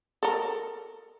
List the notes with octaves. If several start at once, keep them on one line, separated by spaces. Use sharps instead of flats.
A4 A#4